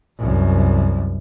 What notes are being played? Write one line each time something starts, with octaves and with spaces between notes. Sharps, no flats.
C2 F#2